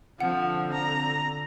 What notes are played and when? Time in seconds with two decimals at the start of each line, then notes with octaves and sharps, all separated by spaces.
0.20 D3 F3 C4 F#5
0.73 A#5